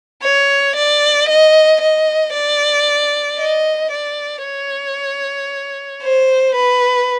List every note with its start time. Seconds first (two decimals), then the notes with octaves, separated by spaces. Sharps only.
0.23 C#5
0.76 D5
1.29 D#5
1.81 D#5
2.34 D5
3.39 D#5
3.92 D5
4.45 C#5
6.03 C5
6.55 B4